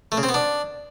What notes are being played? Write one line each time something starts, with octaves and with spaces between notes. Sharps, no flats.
A3
C#3
C4
B3
D4